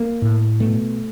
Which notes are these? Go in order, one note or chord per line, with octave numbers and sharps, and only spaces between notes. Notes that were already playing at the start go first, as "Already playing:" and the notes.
Already playing: A#3
A2
B2 A3